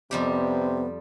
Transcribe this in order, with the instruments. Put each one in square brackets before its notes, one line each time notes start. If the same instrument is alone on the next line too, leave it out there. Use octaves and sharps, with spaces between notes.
[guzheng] F2 G3 G4 [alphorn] C3 [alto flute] B3